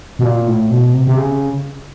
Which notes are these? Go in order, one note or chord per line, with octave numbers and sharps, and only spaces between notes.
B2
A#2
A2
B2
C3
C3
C#3